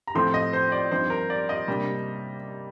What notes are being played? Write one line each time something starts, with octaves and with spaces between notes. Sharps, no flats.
A#5
A2 F3 A3 C4 C6
D#5
C5
D5
G2 F3 C4 D#4 C5
A#4
D5
D#5
C3 G3 A#3 D4